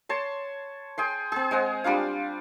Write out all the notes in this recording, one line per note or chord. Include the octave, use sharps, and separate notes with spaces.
C#5 A5 C6
G#4 G5 C6
C4 G#4
G#3 C5 F#5
G3 D4 F4 F5